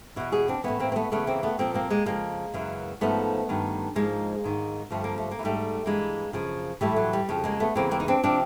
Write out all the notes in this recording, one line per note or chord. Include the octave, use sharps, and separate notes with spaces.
E2 B2 E4 F#4
F#4 G#4
C4 D4
A2 E3 B3 C#4
A#3 C4
C4
A3 B3
E2 C#3 E3 A3 B3
A#3 C4
A3 B3
A#2 F3 A#3 C4
A#3 C4
G#3 A#3
F2 C#3 F3 G#3 A#3
F#2 C#3 E3
G#2 F3 A3 B3
G2 D#3
G#2 F3 G#3 A#3
G#2 D#3
G2 D3 F3 A3
A#3
A3
A#3
E3
G#2 G3 A3
G2 E3 G#3 A#3
F#2 C#3 F3
A2 E3 G3 A3
F#3
G3
F2 C#3 F3
G#3 A#3
A3 B3
E2 C#3 E3 A#3 C4
A#3 C4
D#4
C4 D4
C3 F3 C4 D4